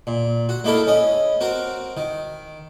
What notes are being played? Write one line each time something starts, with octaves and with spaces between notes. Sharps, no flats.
A#2
F#4
A#3 D#4 E4 A4 A#4
C#4 D#5
C4 F#4 A#4
D#3